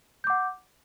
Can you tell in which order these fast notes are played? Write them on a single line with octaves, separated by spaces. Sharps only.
G6 D6 F#5